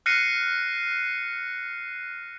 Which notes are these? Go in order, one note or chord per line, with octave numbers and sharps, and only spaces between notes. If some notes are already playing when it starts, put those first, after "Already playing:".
F6 F#6 A#6 C7 C#7 D#7